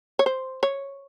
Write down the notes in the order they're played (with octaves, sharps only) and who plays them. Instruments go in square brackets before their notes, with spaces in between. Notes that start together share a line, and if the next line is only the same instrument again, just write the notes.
[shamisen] C#5
C5
C#5